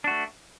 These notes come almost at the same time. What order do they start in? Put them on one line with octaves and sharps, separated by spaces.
D4 F#4 A3